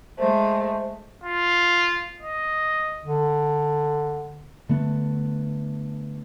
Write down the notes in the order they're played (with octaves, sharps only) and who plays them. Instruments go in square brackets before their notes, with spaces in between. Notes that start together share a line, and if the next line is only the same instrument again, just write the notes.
[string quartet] G#3 A3 [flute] C5
[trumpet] F4
D#5
[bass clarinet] D3
[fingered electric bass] D3 A3 B3